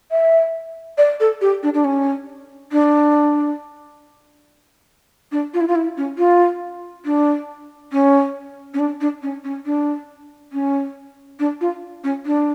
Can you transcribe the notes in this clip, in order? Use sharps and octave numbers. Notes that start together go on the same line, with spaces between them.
E5
D5
A4
G4
D4
D4
C#4
D4
D4
F4
E4
F4
E4
C#4
F4
D4
C#4
C#4
D4
D4
C#4
C#4
D4
C#4
D4
F4
C#4
D4